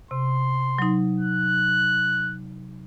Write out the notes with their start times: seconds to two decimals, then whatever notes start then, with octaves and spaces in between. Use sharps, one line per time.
0.11 C3 C6
0.78 F#3 D#4
1.20 F#6